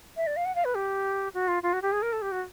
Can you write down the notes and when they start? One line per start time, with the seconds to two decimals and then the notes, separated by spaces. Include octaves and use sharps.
0.17 E5
0.27 D5
0.36 F5
0.45 F#5
0.55 F5
0.65 B4
0.76 G4
1.34 F#4
1.48 F4
1.63 F4
1.73 F#4
1.82 G4
1.92 G#4
2.02 A#4
2.13 A4
2.22 G4
2.32 F#4